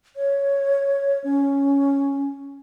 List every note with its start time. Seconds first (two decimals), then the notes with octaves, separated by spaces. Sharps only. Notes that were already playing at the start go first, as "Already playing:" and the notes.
0.16 C#5
1.24 C#4